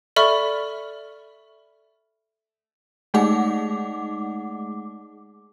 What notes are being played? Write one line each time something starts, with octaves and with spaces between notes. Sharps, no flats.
A4 D5 E5 B5 C#6 F6
G#3 A3 D#4 G#4 F#5 D6